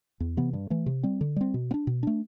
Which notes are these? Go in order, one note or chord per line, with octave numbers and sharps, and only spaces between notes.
E2
C3 E3 B3
G2
E3 A3
C3
G3 C4
D3
G3 C4
B2
B3
D4
B2
A3 D4